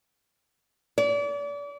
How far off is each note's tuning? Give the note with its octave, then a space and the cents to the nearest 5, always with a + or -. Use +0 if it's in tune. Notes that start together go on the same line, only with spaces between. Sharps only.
D5 -35